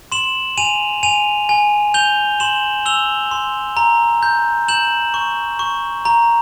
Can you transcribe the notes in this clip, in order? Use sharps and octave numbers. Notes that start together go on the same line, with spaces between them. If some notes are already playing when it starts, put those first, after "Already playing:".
C6 E7 F#7
G#5 D#7 F7
G#5 D#7 F7
G#5
G6 F7 G7
C6 E7 F#7
E6 F7 G7
C6
A#5
G6
G6 E7 F#7
C#6
C#6
A#5